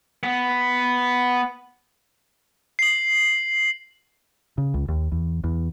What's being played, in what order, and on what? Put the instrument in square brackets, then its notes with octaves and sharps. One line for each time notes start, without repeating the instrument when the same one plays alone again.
[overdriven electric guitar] B3
[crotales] C7 F#7
[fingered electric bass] C#3
C#2
D#2
E2
E2